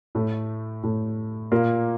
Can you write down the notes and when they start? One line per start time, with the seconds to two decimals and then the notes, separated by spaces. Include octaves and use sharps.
0.15 A2 A3
0.83 A2 A3
1.52 A#2 A#3